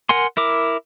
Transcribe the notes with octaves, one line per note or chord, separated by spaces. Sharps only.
A#4 F#5 G#5 C6
E4 A#4 D6